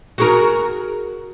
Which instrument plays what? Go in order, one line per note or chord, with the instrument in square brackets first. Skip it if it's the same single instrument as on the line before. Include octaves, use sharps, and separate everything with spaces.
[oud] F#4 G#4 A#4